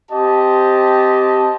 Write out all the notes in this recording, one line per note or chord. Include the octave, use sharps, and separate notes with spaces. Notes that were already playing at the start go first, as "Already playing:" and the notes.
C4 G4 D#5 A5